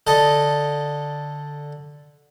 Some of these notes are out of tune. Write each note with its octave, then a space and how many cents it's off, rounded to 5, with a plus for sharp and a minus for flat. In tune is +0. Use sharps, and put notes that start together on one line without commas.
D3 +0 A4 +0 D#5 +0